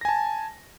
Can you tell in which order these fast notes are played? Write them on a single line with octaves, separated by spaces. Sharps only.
A#6 G#5 A5